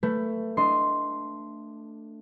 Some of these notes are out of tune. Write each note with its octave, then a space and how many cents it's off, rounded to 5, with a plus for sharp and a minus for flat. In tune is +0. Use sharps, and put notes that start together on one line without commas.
A3 +20 B4 +10
D4 +0 D#5 +0 C6 +0